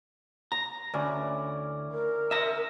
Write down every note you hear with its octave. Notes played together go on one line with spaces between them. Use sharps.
A#5
D2 C#4 E4 D5
A#4
D#5 E5 A#5